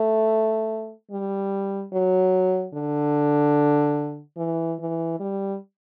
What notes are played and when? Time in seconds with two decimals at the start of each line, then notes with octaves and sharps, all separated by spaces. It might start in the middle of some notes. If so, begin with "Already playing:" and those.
Already playing: A3
1.11 G3
1.93 F#3
2.74 D3
4.37 E3
4.79 E3
5.20 G3